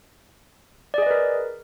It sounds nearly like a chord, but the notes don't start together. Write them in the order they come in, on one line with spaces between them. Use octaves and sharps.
D5 G#4 D#5 B4 A#4